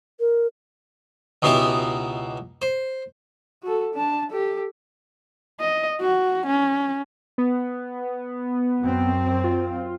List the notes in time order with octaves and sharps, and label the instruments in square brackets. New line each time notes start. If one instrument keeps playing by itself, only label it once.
[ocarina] A#4
[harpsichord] C#2 B2 B3 D#4 E4 G4
C5
[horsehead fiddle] F#4 A4
D4 A5
G4 A4
D#5
F#4
C#4
[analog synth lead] B3
[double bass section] F#2 C4
[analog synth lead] F4